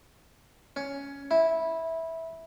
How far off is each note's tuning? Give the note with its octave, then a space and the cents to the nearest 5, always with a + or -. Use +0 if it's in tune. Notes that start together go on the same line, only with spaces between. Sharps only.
C#4 +10
E4 -15